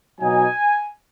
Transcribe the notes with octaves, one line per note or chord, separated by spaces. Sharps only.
B2 F#3 D#4 G#5